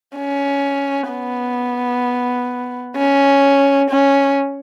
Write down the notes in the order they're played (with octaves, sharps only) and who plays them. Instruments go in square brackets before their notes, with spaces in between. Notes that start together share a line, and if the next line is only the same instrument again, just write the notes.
[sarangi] C#4
B3
C#4
C#4